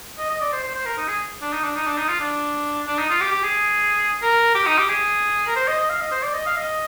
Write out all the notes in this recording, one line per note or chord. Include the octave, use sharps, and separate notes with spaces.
D#5
D#5
D5
C5
C5
C5
A#4
D#4
G#4
D4
D#4
D4
D#4
D4
D#4
F4
D4
D4
D#4
F4
G4
G4
G#4
A#4
G4
D#4
G4
G#4
A#4
C5
D#5
D#5
F5
D#5
C5
D5
D#5
F5
D#5